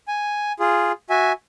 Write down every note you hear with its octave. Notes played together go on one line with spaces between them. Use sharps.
G#5
F4 G#4
F#4 E5 G#5